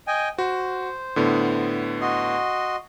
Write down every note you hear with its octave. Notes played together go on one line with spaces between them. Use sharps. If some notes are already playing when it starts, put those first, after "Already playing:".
D#5 G5 G#5
F#4 C5
A2 D3 B3
F#4 D#5 C6